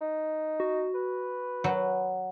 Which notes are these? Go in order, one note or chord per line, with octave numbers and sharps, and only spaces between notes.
D#4
F#4
B4
F#3